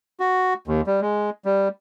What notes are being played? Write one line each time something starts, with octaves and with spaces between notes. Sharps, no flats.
F#4
D#2
G3
G#3
G3